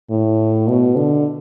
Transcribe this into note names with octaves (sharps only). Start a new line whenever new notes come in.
A2
B2
D3